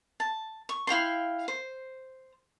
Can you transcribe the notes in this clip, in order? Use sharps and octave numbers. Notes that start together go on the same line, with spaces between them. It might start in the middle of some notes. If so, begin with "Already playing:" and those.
A5
C#6
E4 F5 G5 C6
C5